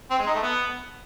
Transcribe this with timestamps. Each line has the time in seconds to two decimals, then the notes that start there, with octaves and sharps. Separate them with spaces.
0.11 C4
0.19 G#3
0.27 D#4
0.35 A3
0.43 B3